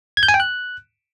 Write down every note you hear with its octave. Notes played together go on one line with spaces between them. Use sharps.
G#6
G6
G#5
G5
F#6